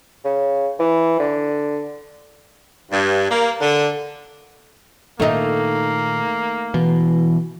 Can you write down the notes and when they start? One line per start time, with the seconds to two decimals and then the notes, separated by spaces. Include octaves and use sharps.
0.25 C#3
0.80 E3
1.20 D3
2.91 G2
3.30 A#3
3.61 D3
5.20 A#2 D#3 A3 A#3 D#4
6.74 B2 E3